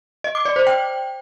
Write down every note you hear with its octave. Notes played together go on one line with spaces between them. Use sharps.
D#5
D6
D5
C5
G5